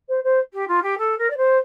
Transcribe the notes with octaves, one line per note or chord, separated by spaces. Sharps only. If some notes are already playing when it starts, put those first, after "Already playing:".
C5
C5
G4
F4
G4
A4
A#4
D5
C5